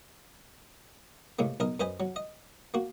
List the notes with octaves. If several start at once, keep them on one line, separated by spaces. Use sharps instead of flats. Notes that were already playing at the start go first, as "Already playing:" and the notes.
A2 C3 G#3 A#3
B1 A#4 D#5
F#2 B4 C5 D#5 G#5
F#3
D#5
A#3 F#4